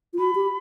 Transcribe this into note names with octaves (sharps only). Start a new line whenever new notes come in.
F4
F#4 B5
G4